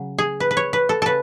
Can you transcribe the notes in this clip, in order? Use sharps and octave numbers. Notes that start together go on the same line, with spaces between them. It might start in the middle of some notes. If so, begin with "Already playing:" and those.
Already playing: C#3 F#3
G#4
B4
B4
C#5
B4
A4
C#3 A4 B4